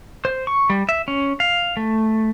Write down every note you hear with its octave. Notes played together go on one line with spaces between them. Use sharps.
C5
C#6
G3
E5
C#4
F5
A3